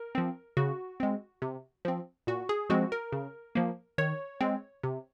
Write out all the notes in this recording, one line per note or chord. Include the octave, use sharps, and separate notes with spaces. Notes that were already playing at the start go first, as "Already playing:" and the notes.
Already playing: A#4
F3 C4
C#3 F#4
G#3 C4
C3
F3 C4
A#2 F#4
G#4
F3 G#3 C4 F#4
A#4
C#3
F3 A#3
D#3 C#5
G#3 C4
C3